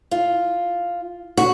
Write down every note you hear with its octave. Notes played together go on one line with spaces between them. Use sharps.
F4
F#4